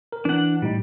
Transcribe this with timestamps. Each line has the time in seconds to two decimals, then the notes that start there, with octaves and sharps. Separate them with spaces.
0.12 A#4
0.25 E3 D4 F#5
0.62 A2 G3 D#4